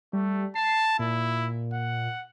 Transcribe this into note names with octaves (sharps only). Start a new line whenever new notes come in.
G3 A3
A5 C7
A#2 E4
F#5